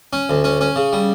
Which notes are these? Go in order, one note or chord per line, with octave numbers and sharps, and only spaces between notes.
C#4
D2
C#4
C#4
C#3
G3